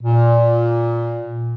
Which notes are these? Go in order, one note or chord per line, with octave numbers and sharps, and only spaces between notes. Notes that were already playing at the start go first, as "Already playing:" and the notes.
A#2